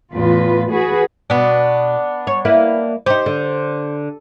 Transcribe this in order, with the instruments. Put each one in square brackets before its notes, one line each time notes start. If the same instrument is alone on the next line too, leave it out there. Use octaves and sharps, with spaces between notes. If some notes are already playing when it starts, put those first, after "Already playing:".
[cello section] E2 A2 F4 B4
F#4 G#4 B4
[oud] B2 [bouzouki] B3 D4
[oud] C#5
A#3 E4 B4
[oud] D#4 G4 [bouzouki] C5
[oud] D3